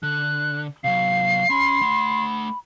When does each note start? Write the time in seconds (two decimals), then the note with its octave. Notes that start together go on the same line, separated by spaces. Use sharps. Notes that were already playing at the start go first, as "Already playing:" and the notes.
0.03 D3 F#6
0.84 C3 F#3 F5 C7
1.50 C#4 B5 C6
1.81 A3 F#5